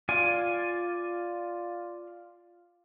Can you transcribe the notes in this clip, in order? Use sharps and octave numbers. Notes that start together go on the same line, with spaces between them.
F4 D5 G#5